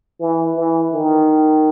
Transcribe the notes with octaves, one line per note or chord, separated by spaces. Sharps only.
E3
E3
D#3